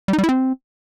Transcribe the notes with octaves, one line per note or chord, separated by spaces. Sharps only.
G3
D#4
G3
E4
C4